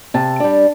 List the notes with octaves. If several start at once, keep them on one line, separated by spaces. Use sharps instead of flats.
C3 A5
G3 D4